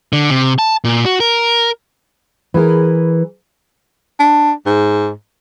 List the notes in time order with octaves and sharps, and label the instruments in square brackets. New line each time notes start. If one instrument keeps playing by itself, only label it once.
[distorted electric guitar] D3
C3
A5
A#2
F#4
A#4
[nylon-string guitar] E3 G#4 A#4
[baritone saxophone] D4
G#2